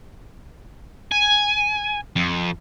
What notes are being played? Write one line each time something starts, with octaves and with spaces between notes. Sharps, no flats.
G#5
F2